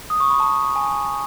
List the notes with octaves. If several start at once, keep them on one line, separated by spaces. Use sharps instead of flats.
D#6
C#6
B5
A5
G#5